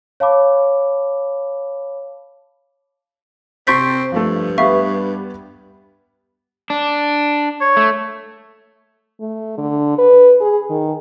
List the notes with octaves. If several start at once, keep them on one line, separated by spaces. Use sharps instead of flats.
C#5 F5 A5 B5 D6
C3 C4 C6 C#6 G6 A6 B6
G2 F3 A3
G3 B3 E5 F5 C#6
D4
C#5
A3
A3
D3
B4
G#4
D#3